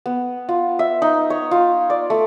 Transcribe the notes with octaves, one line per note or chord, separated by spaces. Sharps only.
B3
F4
E5
D#4
C#5
F4
D5
A3